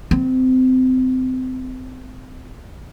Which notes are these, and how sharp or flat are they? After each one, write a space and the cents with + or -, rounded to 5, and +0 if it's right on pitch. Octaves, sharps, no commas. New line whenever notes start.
C4 -30